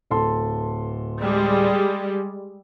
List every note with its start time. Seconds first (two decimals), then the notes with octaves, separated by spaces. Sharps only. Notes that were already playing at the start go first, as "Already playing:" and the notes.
0.11 D1 A4 C6
1.20 G3 G#3